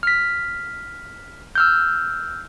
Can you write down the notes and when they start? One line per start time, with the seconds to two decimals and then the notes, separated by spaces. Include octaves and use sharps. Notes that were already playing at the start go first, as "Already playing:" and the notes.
0.03 F6 B6
1.55 E6 F6 G6